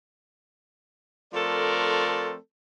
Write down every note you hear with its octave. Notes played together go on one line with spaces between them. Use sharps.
F3 A3 C4 A4 A#4 D5